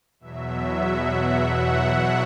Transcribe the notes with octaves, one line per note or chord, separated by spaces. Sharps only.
E2 B2 F#3 E5
F#5
F#5